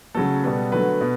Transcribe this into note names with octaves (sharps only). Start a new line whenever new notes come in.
C#3 F#3 A3 A4
B2 G3 B3
D3 F#3 A3 B4
B2